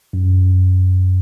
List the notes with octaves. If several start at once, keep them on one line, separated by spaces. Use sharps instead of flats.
F#2